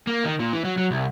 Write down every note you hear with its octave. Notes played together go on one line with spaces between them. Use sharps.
A#3
D#3
A#2
E3
F#3
F#3
C2